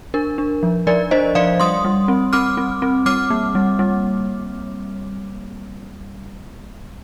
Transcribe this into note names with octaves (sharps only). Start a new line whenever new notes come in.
D4 A#4
D4
F3
F3 A#4 D5
D4 C5 D#5
F3 D5 F5
G3 C6 D#6
G3
C4
C4 D6 F6
C4
C4
G3 D6 F6
A#3
G3
G3